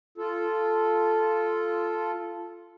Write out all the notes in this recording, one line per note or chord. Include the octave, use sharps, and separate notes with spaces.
F4 A4